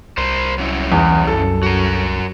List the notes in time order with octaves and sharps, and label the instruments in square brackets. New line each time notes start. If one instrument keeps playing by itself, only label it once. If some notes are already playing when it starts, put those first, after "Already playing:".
[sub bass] C2 [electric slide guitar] A#4 C5
[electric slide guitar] F#3 C#4 E4
[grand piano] E2
[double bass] F#2 [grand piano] A4
[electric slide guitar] F#4 A#4